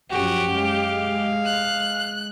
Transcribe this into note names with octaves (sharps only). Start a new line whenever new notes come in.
F#2 F3 C#4 F#4 G4
G#3 F5
F#6